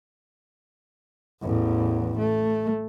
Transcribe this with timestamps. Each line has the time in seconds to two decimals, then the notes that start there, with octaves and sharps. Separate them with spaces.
1.42 A1 E2
2.18 A3